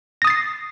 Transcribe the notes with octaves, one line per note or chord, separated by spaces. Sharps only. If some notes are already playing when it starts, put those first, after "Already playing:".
D#6 A6 A#6 C7